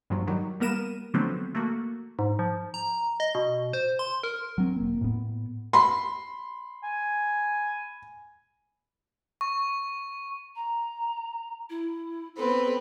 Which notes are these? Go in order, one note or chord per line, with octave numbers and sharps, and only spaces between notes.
G2 A#2 F3 F#3
D#3 F#3 G3
G3 A#3 B3 A#4 D#7 E7
D3 F3 F#3 A3 B3 C4
A3 A#3 F#4
G#2
F3
A#5
D#5
B2
C5
C6
A#4
F#3 C4
E1 A#3
A2 B3
B5 C6
G#5
C#6
A#5
E4
B3 C4 A4 B4